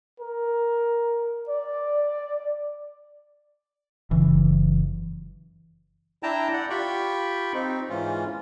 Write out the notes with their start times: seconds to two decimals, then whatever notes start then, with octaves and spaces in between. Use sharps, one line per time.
0.20 A#4
1.49 D5
4.11 F#1 C#3 E3
6.23 D4 E4 G5 A5 A#5
6.53 D5 F#5
6.70 F4 G4 G5 B5 C#6
7.54 C4 D#4
7.90 G#2 E3 C#4 F4